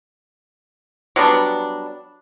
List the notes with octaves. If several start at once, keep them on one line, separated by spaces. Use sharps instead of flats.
F#3 G3 B3 D4